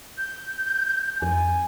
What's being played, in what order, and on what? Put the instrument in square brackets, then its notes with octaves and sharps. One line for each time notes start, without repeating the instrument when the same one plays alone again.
[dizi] G6
[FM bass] F2 [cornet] G#5